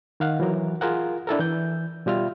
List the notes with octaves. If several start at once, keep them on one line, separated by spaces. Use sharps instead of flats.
D#3 F5 F#5
E3 F#3 A#4
F4 G#4 A#4 F#5
D4 E4 A4 A#4
E3 G6
B2 G3 F4 E5 F6